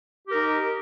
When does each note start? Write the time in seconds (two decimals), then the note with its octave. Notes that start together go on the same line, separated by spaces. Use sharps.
0.28 G4
0.31 A#4
0.34 D#4